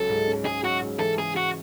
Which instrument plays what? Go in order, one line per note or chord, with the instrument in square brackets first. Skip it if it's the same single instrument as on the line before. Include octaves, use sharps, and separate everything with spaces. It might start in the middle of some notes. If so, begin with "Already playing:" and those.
Already playing: [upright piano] C#2 F#3 [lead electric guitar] A4
[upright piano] G#2
C#4
[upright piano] G#2 [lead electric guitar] G#4
[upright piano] F#3 [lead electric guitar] F#4
[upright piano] G#2
[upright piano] E3 [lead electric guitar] A4
[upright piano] C#3 [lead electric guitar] G#4
[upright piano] G#3 [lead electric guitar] F#4